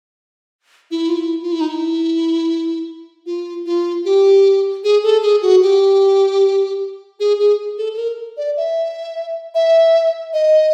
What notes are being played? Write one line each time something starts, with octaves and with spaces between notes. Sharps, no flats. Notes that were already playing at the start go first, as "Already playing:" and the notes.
E4
F4
E4
F4
E4
D#4
E4
F4
F4
G4
G#4
A4
G#4
F#4
G4
G#4
G#4
A4
A4
A#4
D5
E5
E5
D#5